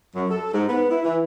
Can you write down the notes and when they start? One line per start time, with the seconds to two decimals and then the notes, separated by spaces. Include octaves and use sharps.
0.15 F#2
0.30 A4
0.54 G#2
0.69 B3
0.90 E4
1.04 E3